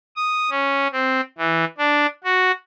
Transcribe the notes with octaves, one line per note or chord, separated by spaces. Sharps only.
D#6
C#4
C4
E3
D4
F#4